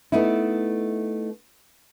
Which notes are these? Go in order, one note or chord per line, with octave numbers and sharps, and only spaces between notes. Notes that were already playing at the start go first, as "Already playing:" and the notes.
A3 B3 D#4 E4